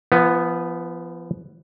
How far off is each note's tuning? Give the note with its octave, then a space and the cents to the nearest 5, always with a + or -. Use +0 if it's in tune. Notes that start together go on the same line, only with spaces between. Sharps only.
F3 -35 B3 +0